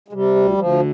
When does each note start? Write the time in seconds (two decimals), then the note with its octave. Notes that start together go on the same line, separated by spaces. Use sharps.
0.08 G#3
0.13 C3 G3
0.35 D2
0.57 D2 F3